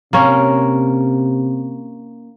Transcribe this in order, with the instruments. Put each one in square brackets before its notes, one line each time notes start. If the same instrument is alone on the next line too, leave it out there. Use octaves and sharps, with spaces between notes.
[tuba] C3 [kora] A#3 C#4